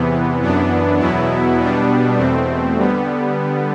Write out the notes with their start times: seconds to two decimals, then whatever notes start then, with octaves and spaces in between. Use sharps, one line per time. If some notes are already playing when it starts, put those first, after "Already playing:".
Already playing: E2 C3 E3 B3
0.41 F#2 E3 B3 D4
1.00 E2 B2 F#3 B3 E4
1.58 B2 G3 B3 D4
2.17 E2 B2 A3 C4
2.76 D3 G3 B3